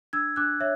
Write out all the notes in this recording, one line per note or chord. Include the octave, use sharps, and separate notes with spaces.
D4 E6 G#6
D4 D6 F#6
C#5 E5